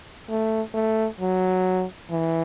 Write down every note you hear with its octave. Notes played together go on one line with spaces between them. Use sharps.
A3
A3
F#3
E3